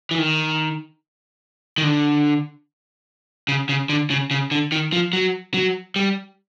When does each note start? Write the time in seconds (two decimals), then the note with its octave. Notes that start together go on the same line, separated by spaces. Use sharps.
0.11 E3
0.19 D#3
1.78 D#3
1.83 D3
3.48 C#3
3.69 C#3
3.89 D3
4.10 C#3
4.31 C#3
4.51 D3
4.72 D#3
4.93 F3
5.13 F#3
5.54 F#3
5.96 G3